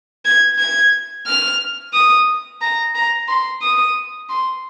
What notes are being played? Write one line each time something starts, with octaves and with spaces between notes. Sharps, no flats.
G#6
G#6
F6
D#6
A#5
A#5
C6
D#6
C6